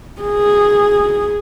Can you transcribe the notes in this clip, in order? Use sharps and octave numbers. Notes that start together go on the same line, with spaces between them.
G#4